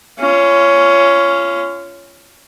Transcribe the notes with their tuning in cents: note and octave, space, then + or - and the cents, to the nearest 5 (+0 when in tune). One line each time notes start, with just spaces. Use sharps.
C#4 +10 F4 -30